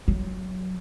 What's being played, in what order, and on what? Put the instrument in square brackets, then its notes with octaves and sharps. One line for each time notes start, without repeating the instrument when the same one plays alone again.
[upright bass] F#3